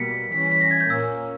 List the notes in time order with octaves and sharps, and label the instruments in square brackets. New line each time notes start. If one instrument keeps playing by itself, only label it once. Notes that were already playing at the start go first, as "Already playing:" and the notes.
Already playing: [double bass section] B2 G3 A#3 [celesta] B6 C#7
[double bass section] E3 G3 C#4 [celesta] B6
[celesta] B6
A#6
G#6
G6
[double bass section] A#2 A#3 C#4 [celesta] E6